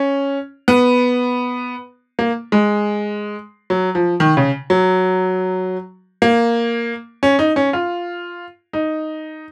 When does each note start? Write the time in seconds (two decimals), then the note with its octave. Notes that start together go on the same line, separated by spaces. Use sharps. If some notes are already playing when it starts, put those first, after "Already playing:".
Already playing: C#4
0.68 B3
2.19 A#3
2.52 G#3
3.70 F#3
3.95 F3
4.20 D#3
4.37 C#3
4.70 F#3
6.22 A#3
7.23 C#4
7.39 D#4
7.56 C#4
7.73 F4
8.73 D#4